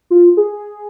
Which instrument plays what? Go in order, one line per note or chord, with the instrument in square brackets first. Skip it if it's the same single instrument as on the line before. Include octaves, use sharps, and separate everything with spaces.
[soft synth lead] F4
G#4